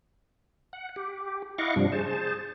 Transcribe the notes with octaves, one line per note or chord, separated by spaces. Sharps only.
F#5
G4
E4 D#5 F5 F#5 C#6 D6
G2 C3 F3 G3 D4
G#4 C5 A5